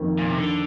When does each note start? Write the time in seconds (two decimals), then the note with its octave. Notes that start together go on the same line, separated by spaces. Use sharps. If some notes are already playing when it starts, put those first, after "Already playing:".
Already playing: F2 D#3 A#3
0.19 A#2
0.29 C3
0.38 D3